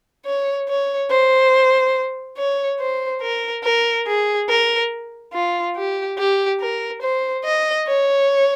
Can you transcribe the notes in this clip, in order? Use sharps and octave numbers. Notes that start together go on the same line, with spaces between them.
C#5
C#5
C5
C#5
C5
A#4
A#4
G#4
A#4
F4
G4
G4
A#4
C5
D#5
C#5